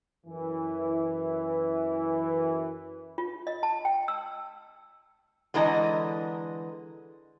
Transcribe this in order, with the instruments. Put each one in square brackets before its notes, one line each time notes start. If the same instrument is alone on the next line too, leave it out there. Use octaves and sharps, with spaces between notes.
[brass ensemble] F#2 E3
[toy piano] F4
D#5
A5
G5
E6
[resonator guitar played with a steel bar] D3 E3 G#3 D#5 A#5